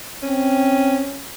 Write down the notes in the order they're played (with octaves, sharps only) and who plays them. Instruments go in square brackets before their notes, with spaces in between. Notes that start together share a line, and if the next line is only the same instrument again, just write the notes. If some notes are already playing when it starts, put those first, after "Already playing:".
[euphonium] C4 [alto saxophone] C#4